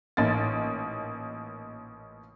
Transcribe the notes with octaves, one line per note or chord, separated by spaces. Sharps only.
A1 A#2 A#3 D#4 A6